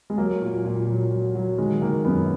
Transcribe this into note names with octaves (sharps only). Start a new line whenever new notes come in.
G#3
F#3 A#3
A#2
A#2
F#3
F#3
F#3
D#3 G#3
D#3 A#3
F#2 B3